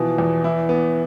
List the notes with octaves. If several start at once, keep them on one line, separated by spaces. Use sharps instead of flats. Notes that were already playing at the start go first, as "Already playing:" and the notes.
Already playing: B2 E3 F3
E2
E4
B3